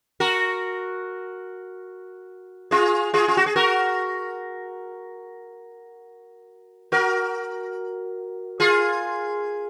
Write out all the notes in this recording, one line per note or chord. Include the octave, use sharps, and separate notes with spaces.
F#4 A#4
F4 G#4
F4 G#4
F4
F#4
G#4
F#4 A#4
F#4 A#4
F4 G#4